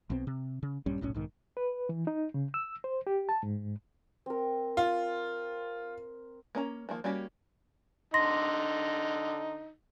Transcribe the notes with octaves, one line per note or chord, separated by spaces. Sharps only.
B1 B2 C4
C3
C#3
A#1 G2 G3 C#4
F1 B1 A2 C#4
B1 G#2 D#3
B4
E3
D#4
C#3
E6
C5
G4
A5
G#2
C4 A#4
F4
A#3 C#4 A#5
D#3 F3 A#3
G3 A#3 C#4 F#4 G4
D3 D#4 C6 A#6